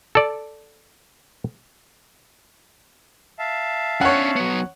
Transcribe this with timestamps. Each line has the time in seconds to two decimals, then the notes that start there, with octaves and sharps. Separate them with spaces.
0.15 A4 D5
3.39 E5 F5 A5
4.01 C#4 D4 C#5 F#5
4.36 F#3 B3